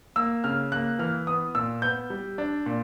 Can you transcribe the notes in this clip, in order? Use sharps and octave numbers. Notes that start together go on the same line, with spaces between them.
A#3 E6
C#3 F6
A#3 F#6
E3 F6
B3 D#6
A#2 E6
B3 G6
G3
D4
A#2